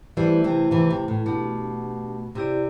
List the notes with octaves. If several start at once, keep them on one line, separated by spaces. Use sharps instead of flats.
E3 G3 A3 C4 E4 G4 C5
C3 E3
C3 E3
C3
A2
B2 A3 D4 G4
C3 C4 E4 G4 D5